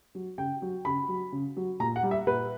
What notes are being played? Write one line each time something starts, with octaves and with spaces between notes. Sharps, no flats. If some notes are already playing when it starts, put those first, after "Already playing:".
F#3
C#3 G5
F#3
C#3 B5
F#3
C#3
F#3
A#2 A#5
F#5
G3
E5
A#2 B4